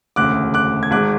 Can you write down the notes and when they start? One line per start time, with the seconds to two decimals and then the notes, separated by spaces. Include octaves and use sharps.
0.16 E1 D2 C#3 D6 F#6
0.54 D6 F#6
0.83 G#6
0.91 G#1 G#2 G#3 D6 F#6